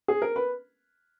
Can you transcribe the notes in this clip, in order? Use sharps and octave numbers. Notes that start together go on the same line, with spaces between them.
G#4
A#4
B4